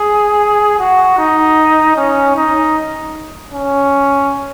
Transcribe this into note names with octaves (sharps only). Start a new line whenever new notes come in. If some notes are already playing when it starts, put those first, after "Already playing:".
Already playing: G#4
F#4
D#4
C#4
D#4
C#4